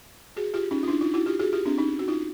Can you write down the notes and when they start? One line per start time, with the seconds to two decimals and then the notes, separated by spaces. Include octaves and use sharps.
0.36 F#4 G#4
0.54 F4 G4
0.71 C#4 D#4
0.83 F4
0.88 D4 E4
1.01 D#4 F4
1.14 E4 F#4
1.26 F4 G4
1.40 F#4 G#4
1.53 F4 G4
1.66 C4 D4
1.78 C#4 D#4
1.99 F#4
2.08 D#4 F4